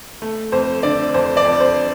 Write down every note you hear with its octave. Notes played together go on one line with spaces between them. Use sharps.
A3
F2 C5
D3 D5
F2 C5
D5
F2
C5